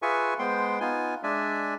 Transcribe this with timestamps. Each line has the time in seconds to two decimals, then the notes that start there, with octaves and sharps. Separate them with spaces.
0.02 F4 G#4 B4 E5 G#5 C#6
0.39 G#3 B3 C5 G5 C6
0.81 B3 D#4 F4 G#5
1.23 G#3 D4 D5 E5 G#5